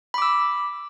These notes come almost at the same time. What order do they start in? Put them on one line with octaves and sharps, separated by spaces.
B5 D6 E6